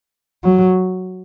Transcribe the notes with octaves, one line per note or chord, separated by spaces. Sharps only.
F#3